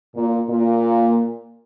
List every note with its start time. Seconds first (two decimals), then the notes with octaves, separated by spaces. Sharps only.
0.16 A#2
0.50 A#2